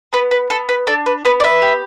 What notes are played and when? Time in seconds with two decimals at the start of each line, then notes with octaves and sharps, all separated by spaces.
0.13 B3 B4
0.31 B4
0.50 B3 A4
0.69 B4
0.87 D4 A4 D5
1.06 B4
1.25 B3 B4
1.40 D5
1.44 B4 E5
1.62 G4